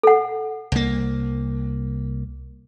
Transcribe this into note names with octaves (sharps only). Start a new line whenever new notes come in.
A4 F#5
C2 A#3